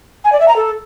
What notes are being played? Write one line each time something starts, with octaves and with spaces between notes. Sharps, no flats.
G#5
D5
E5
A#5
A4